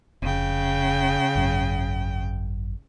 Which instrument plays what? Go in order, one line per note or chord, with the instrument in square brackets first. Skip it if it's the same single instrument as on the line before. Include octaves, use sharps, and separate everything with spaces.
[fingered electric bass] F1 [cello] C#3 G5
[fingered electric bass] G#1 F#2